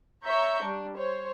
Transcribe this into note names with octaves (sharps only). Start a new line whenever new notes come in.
C#5 E5 A#5 C#6 G6
G3 D4
C5 C#5